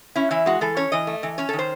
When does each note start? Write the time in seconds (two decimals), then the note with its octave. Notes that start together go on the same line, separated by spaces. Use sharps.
0.16 C#4 E4
0.31 E3 E4
0.46 G#3 F#4
0.61 E3 A4
0.77 C#4 C#5
0.92 E3 D#5
1.07 A3
1.23 E3
1.38 C#4 C#5
1.49 A4
1.53 D#3
1.59 C5